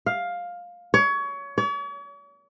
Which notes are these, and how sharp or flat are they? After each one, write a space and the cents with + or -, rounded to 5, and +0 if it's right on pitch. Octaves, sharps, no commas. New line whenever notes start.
F5 +10
C#5 +25
C#5 +45